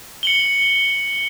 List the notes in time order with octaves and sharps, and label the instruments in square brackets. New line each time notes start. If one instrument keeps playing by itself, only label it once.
[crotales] C#7 F#7 G7